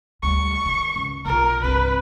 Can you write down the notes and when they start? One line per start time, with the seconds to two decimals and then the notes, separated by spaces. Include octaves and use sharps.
0.23 D2 G3 C#6
0.66 D#3
0.96 C#2
1.26 B1 F4 A#4
1.64 C2 G2 B4